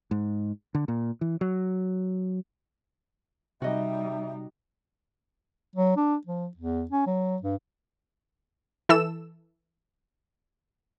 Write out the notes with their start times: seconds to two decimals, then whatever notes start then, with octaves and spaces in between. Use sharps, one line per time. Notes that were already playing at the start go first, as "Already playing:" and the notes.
0.11 G#2
0.75 D3
0.88 A#2
1.21 E3
1.41 F#3
3.62 C3 G3 D#4 F#4 D#5 E5
5.76 F#3
5.97 D4
6.27 F3
6.57 E2
6.91 C#4
7.07 F#3
7.42 G2
8.89 E3 A4 E6 E7